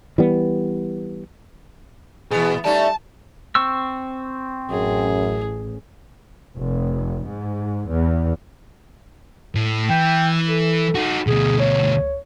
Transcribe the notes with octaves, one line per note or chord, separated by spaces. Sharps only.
E3 G3 B3
B2 E3 B3 G#4
G3 A3 C#4 D#4 D5 A5
C4 C#6 E6
A1 F#2 G#4
F1
G#2
E2
A2
E3 G5
A4
D#4 F#4
D2 B2 G#4
C#5